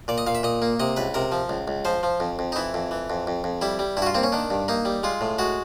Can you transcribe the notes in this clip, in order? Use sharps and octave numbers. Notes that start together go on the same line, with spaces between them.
A#2 D5
D#5
A#2 F5
E5
A#2 D#5
A#3
C3 D#5
C#2 B4
C3 A#4
F3
C#2
C#2
F3 C5
F3
F2
F2
D#4
E3 E4
F2
E3
F2
F2
F2
G3 E4
G3
G2 E4
F#4
F4
A#3 C4
C#4
D#3 D4
G2
A#3 D#4
G3
G#3 F4
A2
G#3 F#4